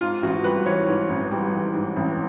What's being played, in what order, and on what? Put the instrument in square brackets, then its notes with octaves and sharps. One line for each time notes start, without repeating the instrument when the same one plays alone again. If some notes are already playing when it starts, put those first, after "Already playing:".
[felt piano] G#2 F4
A1 F#4
G3 B4
E3 C#5
G#2
A1
G3
E3
G#2
A1